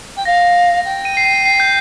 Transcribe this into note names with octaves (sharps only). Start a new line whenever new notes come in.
G5
F5 A#6
G5
D#7
C7
D#7
C7
G6